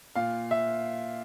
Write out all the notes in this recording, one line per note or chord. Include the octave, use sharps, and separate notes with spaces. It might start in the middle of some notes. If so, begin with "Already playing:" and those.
A#2 F5
E5